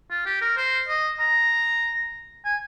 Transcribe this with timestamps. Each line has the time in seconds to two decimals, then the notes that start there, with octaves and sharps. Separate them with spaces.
0.10 F4
0.26 G4
0.41 A#4
0.57 C5
0.88 D#5
1.20 A#5
2.45 G#5